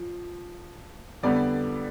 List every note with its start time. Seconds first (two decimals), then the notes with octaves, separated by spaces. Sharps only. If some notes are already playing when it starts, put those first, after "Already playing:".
Already playing: F3
1.23 F2 D3 G3 B3 D5